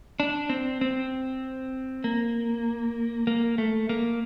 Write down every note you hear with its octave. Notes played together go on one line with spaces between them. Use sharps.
D4
C4
C4
A#3
A#3
A3
A#3